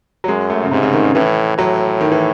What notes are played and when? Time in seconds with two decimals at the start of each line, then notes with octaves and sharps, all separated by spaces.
0.24 F#3
0.28 F#2 G#3
0.50 A3
0.63 C#3
0.71 G#2 C3
0.83 C#3
0.93 D#3
1.04 C#3
1.15 A2 E3
1.58 A2 F#3
2.01 D#3
2.12 E3